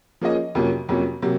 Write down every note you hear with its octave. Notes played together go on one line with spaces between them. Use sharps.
F3 A#3 C#4 G#4 D#5
F2 C3 F#3 A#3 C#4
F2 C3 F#3 A#3 C#4
C3 F#3 A#3